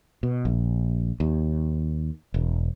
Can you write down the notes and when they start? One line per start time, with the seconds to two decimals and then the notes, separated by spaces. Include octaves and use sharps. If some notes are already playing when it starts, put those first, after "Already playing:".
0.23 B2
0.45 A#1
1.20 D#2
2.34 E1